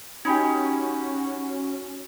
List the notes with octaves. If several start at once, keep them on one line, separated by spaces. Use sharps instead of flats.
C#4 D#4 F#4 G4 G#5 B5 G#6